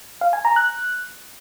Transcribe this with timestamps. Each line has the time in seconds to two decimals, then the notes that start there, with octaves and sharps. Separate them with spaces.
0.21 F5
0.33 G#5
0.45 A#5
0.56 F#6